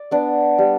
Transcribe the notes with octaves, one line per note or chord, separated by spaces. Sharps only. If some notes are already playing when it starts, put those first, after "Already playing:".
Already playing: D5
B3 D4
G3